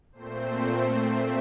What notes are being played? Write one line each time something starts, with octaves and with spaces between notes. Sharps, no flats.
A#2 A3 C4 C5
E5